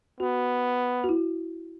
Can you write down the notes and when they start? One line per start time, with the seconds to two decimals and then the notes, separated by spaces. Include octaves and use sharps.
0.20 B3 F#4
1.04 F#4
1.09 E4